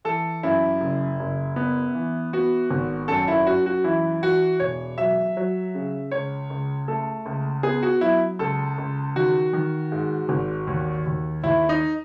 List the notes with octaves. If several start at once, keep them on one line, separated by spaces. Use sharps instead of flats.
E3 A4
F#2 E4
F#1
F#1
B3
E3
B3 F#4
G#1
F#2 A4
E4
F#2 F#4
F#4
E3 E4
E3 F#4
E1 C#5
F#3 E5
F#3
C#3
C#2 C#5
C#2
A3 A4
C#2
B3 G#4
F#4
F#3 E4
C#2 A4
C#2
D#3 F#4
D#3
G#2
G#1
D#2
D#2
D#2 E4
D#4